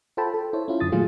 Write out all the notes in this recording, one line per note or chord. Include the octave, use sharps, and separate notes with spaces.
F4 A4 C5 G5 A5 B5
A4
E4 C5 C#5
C#4 E4 F4
F#2 D3 D#6 A6
A#2 D#3 F#3 A3 F4 G#4